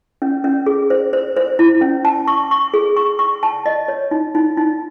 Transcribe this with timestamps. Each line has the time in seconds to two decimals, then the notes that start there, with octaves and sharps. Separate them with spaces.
0.22 C#4
0.44 C#4
0.66 G#4
0.90 C5
1.13 C5
1.36 C5
1.59 E4
1.81 C#4
2.05 A5
2.28 C#6
2.51 C#6
2.74 G#4
2.97 C#6
3.19 C#6
3.43 A5
3.66 D#5
3.88 C#5
4.11 D#4
4.35 D#4
4.57 D#4